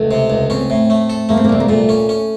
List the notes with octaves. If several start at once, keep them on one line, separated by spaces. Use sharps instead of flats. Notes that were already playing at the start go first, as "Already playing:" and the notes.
Already playing: C#2 A3
C3
C#2
C4 C#4
A2
A3
A4
A3 A#3
C4
A#3
C2 C4
A#3
A#2 A3
C#4
C#4